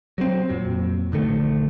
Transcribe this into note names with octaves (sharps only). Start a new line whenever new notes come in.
F#3 G3 C4
F2 A#2 F#3
A#1 D3 D#3 A3